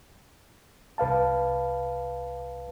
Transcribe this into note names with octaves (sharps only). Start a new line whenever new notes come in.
C2 B4 F5 A5